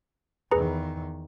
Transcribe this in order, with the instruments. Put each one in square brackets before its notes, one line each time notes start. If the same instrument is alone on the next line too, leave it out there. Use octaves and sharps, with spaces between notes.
[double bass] E2 D#3 [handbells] G#4 B4 A#5